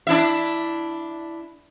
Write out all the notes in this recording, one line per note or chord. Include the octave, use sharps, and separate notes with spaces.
D4 E4 E5